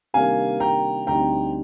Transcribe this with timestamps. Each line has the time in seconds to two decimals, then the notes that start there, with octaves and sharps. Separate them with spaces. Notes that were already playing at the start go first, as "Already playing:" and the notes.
0.14 C3 D#3 G3 A#3 D4 F5 G#5
0.60 G5 A#5
1.07 D2 D3 G3 C4 D#4 G5 A#5